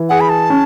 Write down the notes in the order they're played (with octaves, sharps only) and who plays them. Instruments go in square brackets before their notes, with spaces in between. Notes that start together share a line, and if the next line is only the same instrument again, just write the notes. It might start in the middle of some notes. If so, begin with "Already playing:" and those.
Already playing: [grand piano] E3
[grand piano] G#4 [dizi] F#5
[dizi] B5
A5
[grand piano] C#4